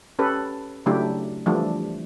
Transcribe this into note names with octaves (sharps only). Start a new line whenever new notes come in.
C#4 G4 A4 B4
C#3 F#3 A3 D4 E4 G4
E3 F3 G3 A3 D4